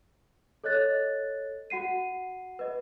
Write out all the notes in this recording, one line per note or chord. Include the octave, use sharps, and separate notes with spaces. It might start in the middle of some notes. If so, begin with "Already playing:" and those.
A4 C#5 D#5 F#6 A6
F#4 F#5 C7 D#7
B4 D#5